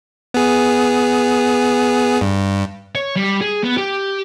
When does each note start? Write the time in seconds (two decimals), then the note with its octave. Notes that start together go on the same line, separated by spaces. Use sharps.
0.34 B3 G#4
2.21 G2
2.95 C#5
3.16 G3
3.41 G#4
3.64 B3
3.77 G4